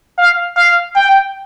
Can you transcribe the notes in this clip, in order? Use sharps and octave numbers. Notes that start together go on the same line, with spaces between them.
F5
F5
G5